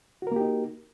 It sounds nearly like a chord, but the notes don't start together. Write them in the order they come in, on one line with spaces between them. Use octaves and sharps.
F#4 A#4 A#3 G4 D#4